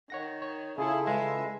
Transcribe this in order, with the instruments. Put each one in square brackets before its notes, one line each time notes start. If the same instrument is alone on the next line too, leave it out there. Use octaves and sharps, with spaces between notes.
[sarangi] D#3 [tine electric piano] C#5 F#5 A#6
[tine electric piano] C#5
[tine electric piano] C#3 F4 A4 [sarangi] E4 [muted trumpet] G#4
[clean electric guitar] G#3 [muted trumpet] B4 [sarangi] E5